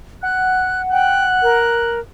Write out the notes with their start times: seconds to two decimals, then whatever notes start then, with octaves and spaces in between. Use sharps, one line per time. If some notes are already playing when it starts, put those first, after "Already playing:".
0.23 F#5 F#6
0.91 G5 F#6
1.43 A#4